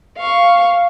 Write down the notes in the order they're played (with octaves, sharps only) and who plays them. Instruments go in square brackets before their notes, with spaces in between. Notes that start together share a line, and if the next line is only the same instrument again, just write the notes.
[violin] F5 C#6